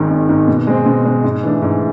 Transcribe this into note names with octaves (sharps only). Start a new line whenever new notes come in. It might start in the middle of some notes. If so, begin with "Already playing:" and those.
Already playing: G#1 G#2 D#3
G#1
G#2 D#3
B2
G#3 C4
B2
G#3 C4
G#2
E3 A3 D4
G#2